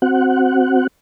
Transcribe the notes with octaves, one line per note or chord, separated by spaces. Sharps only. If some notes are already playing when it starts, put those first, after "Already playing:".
C4 F#4 F#5